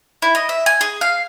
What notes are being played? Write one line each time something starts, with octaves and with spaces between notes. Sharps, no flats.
E4
D#5
E5
G#5
G#4
F5